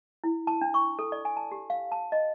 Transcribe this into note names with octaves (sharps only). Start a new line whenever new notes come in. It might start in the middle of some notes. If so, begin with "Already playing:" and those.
E4
A5
D4
C#6
A4
D5
G#5
A5
G4
F5
A5
D#5